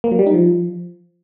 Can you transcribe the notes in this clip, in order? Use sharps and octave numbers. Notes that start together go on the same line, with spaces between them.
A#3
F#3
G3
D#4
F3